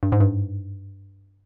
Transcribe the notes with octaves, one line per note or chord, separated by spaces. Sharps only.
G2
G#2
G2